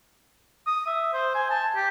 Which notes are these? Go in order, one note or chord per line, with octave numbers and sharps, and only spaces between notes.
D#6
E5
C5
G#5
A5
G4